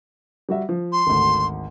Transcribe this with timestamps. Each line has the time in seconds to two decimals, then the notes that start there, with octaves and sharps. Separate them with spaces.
0.49 G3 F#4 E5
0.69 F3
0.92 C6
1.07 G#1 D2